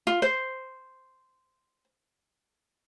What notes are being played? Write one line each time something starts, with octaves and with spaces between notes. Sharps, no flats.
F4
C5